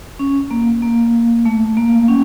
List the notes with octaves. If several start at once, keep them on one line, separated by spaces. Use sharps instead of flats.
C#4
A#3
A#3
A3
A#3
C#4